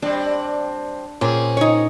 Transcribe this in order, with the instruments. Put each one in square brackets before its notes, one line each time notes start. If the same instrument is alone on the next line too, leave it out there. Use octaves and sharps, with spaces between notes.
[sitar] G3 C4 [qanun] D4
[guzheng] A#2 [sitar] C4 G#4 [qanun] C#4
[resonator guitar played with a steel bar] D#4 C#5